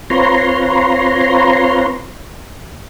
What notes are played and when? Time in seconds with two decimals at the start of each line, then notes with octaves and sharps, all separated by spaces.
0.10 C4 F4 B4 C#5 A#5 C6